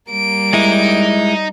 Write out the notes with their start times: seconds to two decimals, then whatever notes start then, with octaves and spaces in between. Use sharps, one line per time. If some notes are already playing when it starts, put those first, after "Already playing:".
0.11 G3 A#3 D7
0.53 G#3 D#4 E4